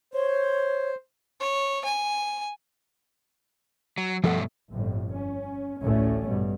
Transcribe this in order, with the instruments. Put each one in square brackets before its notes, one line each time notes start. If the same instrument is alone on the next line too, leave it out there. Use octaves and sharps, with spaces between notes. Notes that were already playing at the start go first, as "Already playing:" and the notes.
[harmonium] C5 [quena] C#5
[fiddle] C#5
G#5
[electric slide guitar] F#3
[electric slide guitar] G2 B2 A3 [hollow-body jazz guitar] F3 A4 F#5
[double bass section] G1 F2 A2
C#4
A1 D2 A2 A3 C#4
G2 B2